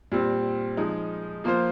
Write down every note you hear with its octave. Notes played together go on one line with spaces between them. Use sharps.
A#2 G3 C4
F3 G#3 D#4
F3 A#3 F4 C5